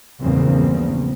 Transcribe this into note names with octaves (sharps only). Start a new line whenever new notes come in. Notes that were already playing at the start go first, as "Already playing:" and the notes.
A#1 E2 G2 A#2 C#3 C4